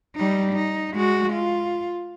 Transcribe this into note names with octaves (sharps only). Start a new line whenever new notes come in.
G3 D#4
D#4
G#3 F#4
F4